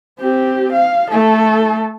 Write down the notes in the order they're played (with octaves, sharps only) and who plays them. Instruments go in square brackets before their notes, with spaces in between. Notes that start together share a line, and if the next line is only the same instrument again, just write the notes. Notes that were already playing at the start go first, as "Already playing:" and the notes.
[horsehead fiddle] C4 G4
F5
A3 A4